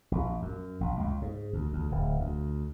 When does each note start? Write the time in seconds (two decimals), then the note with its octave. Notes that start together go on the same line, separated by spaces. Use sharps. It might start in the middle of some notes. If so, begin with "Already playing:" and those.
0.12 A#1
0.42 F#2
0.81 A#1
0.99 C#2
1.22 G#2
1.53 D2
1.73 D2
1.91 D1
2.20 D2